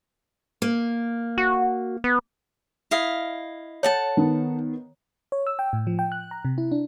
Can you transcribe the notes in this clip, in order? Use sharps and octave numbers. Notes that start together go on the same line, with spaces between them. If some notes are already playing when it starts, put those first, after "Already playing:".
A#3
F#4
B3
E4 D#5 F5
A4 C#5 F#5 A5
D#3 B3
C#5
E6
G5
A2
F3
G5
F#6
A#5
C3
E4
D4